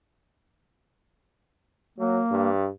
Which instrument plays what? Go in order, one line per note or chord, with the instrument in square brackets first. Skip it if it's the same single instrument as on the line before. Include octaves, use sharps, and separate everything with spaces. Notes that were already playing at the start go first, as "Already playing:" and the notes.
[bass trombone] F#3 [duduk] A#3
[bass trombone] G2